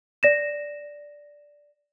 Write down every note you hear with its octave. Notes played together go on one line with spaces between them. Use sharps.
D5 A#6 E7